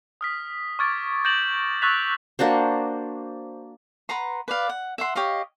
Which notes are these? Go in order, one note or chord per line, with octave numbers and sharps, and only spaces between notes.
D#6 F6 B6
C#6 D6 F6 G#6 A6 D7
G6 A6 A#6 D7 E7 F#7
C#6 E6 F#6 A6 B6 F7
A#3 D4 F#4 C5
B4 F#5 A#5 C6
B4 D5 F5
F#5
E5 F#5 C6
G4 C#5 D#5 F5